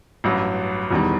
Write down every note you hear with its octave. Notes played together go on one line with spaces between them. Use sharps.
A1 G2 F#3
E1 E2 D#3 G3